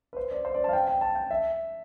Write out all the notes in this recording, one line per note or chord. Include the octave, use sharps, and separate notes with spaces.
B4
C5
D5
C5
D5
A5
F5
G5
G5
A5
G5
E5